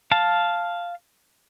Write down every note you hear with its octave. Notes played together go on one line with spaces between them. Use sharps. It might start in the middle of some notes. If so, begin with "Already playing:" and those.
F5 A5